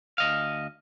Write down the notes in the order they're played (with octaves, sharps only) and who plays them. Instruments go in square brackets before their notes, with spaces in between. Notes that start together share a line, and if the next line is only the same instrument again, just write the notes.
[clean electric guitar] D2 D#5 F5